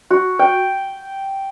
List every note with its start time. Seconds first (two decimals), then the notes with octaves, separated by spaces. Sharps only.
0.10 F#4
0.39 G5